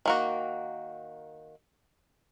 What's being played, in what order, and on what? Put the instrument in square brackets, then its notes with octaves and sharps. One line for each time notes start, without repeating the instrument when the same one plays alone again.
[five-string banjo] D#3 A#3 F#4